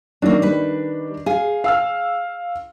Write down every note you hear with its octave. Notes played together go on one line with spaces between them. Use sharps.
D#3 F#3 A#3 D4
G3 B4
G#4 F5
F5 E6 F6